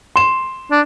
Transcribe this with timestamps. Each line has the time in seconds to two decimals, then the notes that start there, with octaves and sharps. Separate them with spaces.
0.16 C6 E7
0.71 D4